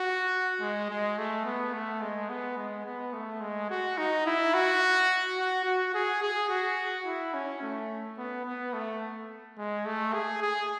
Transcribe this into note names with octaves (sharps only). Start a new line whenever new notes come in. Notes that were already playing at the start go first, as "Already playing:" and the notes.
Already playing: F#4
G#3
G#3
A3
B3
A3
G#3
B3
G#3
B3
A3
G#3
F#4
D#4
E4
F#4
F#4
F#4
G#4
G#4
F#4
E4
C#4
A3
B3
B3
A3
G#3
A3
G#4
G#4